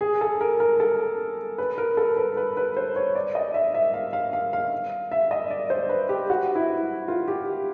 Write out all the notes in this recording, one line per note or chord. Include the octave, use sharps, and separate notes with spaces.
G#4
A4
A#4
A#4
A4
B4
A#4
A4
B4
B4
B4
C5
C#5
D5
D#5
E5
E5
F5
F5
F5
F5
E5
D#5
D5
C5
B4
G4
F#4
E4
F4
G4